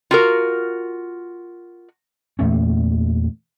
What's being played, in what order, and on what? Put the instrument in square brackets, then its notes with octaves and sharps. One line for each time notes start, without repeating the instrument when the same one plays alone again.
[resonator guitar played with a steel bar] F4 F#4 A#4
[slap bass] E2 A#2 A3 C#4